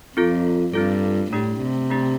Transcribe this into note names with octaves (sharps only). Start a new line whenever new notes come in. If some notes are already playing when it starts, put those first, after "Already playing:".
F2 C4 F4 A4
G2 C4 F4 A4
A2 A3 D4 G4
C3
A3 D4 G4